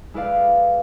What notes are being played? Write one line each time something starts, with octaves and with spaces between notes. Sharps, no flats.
G#3 E4 B4 D5 F5